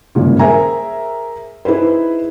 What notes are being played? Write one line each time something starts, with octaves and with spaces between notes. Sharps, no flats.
G#1 G2 A#2 C#3
G#4 A#4 C5 E5 G#5 A#5
D#4 E4 G#4 B4 C5